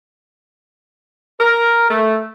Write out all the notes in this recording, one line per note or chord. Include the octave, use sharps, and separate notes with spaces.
A#4
A3